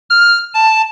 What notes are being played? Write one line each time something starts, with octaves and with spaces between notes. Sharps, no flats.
F6
A5